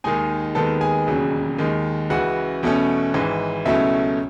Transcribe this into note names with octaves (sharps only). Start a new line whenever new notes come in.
D#2 D#3 G#3 D#4 G#4 G#5
D#2 D#3 G#3 B3 A4 A5
G#4 G#5
E1 D#2 C#3 F#3
D#2 D#3 G#3
C#2 C#3 E3 F#4 F#5
E2 B2 A3 C#4
G#1 G#2 E3
C#2 B2 F#3 A3 C#4 E4 E5